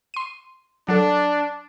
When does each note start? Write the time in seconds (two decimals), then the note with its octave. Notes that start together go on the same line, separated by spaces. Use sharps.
0.14 C6 D#7
0.88 F#3 D4 A4